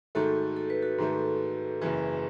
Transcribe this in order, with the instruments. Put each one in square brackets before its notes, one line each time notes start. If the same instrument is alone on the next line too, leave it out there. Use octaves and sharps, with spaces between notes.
[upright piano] G#2 D#3 A3 [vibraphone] F#4 A4
[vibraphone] A4
B4
F#4 A4
[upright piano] G#2 D#3 A3
[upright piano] F#1 F#2 E3 [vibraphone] G#4 B4